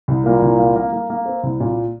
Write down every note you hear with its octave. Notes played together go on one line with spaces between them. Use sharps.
C2
A#2 A#3
C2
A#3
A#3
A#3
A#3
C4
C2
A#2